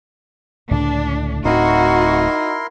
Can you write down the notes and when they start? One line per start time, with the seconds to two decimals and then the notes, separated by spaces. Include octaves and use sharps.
0.71 C#2 A2 D3 D4
1.45 D1 A2 C4 D#4 E4 F#4 A#4 C6